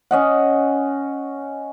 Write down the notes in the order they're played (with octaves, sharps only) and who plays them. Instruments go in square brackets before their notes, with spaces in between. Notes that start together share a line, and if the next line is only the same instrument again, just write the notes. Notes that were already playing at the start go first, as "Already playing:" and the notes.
[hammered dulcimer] C#4 D#5 F#5